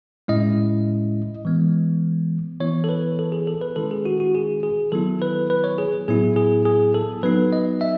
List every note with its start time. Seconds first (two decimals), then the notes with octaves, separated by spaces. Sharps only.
0.28 A2 G#3 C#4 E4 D#5
1.45 E3 G#3 B3
2.60 E3 B3 E4 C#5
2.84 A4
2.89 B4
3.19 A4
3.32 G#4
3.47 A4
3.61 B4
3.76 D#3 G#3 C#4 E4 A4
3.91 G#4
4.05 F#4
4.20 F#4
4.35 G#4
4.63 G#4
4.92 D#3 F#3 B3 E4 A4
5.22 B4
5.50 B4
5.64 C#5
5.78 G#4
6.08 A2 F#3 B3 E4 G#4
6.36 G#4
6.65 G#4
6.94 A4
7.23 F#3 B3 D#4 B4
7.53 D#5
7.81 E5